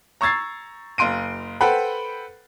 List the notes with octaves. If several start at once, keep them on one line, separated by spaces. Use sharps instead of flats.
A#5 C#6 E6 G#6 A6 C7
F#1 F5 C6 D7 D#7
A4 B4 C5 F#5 G5 B5